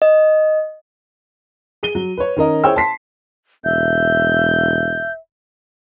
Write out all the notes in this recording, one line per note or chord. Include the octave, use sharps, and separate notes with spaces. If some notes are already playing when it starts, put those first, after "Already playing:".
D#5
G#4 D#7 G7
F#3
B4 C#5
D#3 C#4 A#4 D#5
E4 G#4 C5 C#5 G5 E6
A5 C6 B6 C7
E1 E5 G6